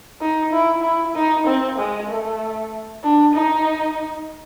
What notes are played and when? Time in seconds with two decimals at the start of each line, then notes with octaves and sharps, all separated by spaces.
0.21 D#4
0.53 E4
0.83 E4
1.16 D#4
1.47 C4
1.78 G#3
2.10 A3
3.03 D4
3.34 D#4